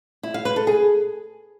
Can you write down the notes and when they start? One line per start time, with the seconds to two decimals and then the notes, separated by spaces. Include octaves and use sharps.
0.23 E4
0.34 F5
0.45 B4
0.56 A4
0.67 G#4